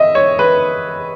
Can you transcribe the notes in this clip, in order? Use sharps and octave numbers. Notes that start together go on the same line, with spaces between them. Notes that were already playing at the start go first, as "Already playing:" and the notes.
Already playing: D#5 E5
C#5
B4